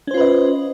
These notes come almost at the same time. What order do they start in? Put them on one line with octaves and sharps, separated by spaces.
C#4 C5 F4 B4 D#5